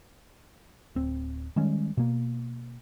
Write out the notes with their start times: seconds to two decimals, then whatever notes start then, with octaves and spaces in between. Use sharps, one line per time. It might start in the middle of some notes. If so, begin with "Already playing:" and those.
0.95 D1 C4
1.56 D#3 G3 G#3 C#4
1.97 B2 A#3